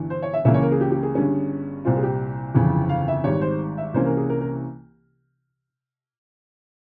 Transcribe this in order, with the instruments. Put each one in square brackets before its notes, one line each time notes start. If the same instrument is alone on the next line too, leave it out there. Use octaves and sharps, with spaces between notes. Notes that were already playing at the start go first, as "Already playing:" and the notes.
Already playing: [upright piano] G1 G2 E3
C5
C#5
E5
C#2 C#3 E3 A#3 C#4 E5
C#5
A#4
G#4
G4
G4
G#4
G1 G2 G3 C#4
C2 A#2 G3 C4 F4
G#4
G4
G1 F2 C#3 E3
F5
E5
G#1 G#2 G3 C#5
C5
E5
C2 C3 E3 A#3 C#4 C5
A#4
G#4
A#4
A#4